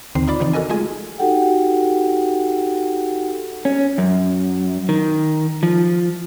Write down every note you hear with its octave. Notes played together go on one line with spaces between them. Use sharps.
D#2 D3 D#3 C4 D#4 C7
D#4 F4 D5 B5 D6
C#3 E3 F3 C4 D#4
F#4 A4 A#4 D#5 G#5
G#3 A3 F4 G#4 G#5
D#4 F#4 G4 A4 F#5 G5
C#4
F#2
D#3
F3